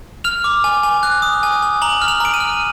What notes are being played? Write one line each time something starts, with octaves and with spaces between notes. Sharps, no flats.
F6 F7
D6
G#5
G#5
F#6
D#6
G#5
G#5
A#5 F#7
F6
F7
A#5 D7
D#7
F6